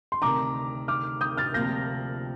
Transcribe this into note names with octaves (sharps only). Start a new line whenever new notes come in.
C6
D2 C3 D#3 A#5 D6
D6 F6
D#6 G6
F6 A6
D2 C3 F3 A#3 G6 A#6